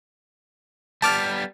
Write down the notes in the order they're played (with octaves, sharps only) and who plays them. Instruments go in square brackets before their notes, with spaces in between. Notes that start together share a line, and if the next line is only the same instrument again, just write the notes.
[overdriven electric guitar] G3 B3 [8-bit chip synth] A5 D6 F6